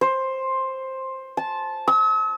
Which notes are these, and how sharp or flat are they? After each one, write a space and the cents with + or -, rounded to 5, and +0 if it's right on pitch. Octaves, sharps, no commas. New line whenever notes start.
C5 +10
A5 -15
E6 -45